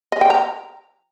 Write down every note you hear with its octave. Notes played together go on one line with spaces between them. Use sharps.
D#5
G5
A#5